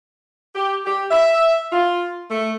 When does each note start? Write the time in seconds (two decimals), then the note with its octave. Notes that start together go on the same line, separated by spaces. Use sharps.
0.55 G4
0.84 G4
1.10 E5
1.71 F4
2.29 A3